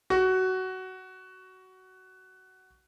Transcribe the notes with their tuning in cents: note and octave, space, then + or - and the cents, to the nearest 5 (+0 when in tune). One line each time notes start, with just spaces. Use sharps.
F#4 +15